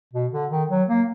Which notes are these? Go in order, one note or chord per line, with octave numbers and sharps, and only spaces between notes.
B2
D3
D#3
F#3
A#3